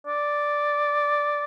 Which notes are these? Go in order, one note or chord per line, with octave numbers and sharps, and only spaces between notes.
D5